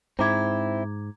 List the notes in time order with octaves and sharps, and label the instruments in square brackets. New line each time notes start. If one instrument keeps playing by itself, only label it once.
[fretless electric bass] G#2 [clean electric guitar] C4 E4 [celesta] A#5 D6 G#6